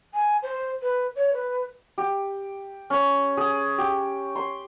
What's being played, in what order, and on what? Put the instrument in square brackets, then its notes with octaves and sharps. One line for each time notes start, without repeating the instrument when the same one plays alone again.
[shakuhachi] G#5
C5
B4
C#5
B4
[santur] G4
C#4
G#4
G4
C6